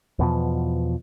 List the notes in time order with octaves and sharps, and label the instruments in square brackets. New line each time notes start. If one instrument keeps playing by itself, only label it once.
[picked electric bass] E2 B2 F3